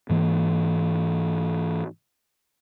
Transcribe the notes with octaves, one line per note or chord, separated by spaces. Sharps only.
G#2 E3 A#3